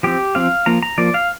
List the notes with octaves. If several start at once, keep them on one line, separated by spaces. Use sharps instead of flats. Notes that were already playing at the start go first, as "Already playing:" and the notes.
F3 C4 G4
F3 C4 F5
F3 A#3 A#5
A#5
F3 A#3 D5
F5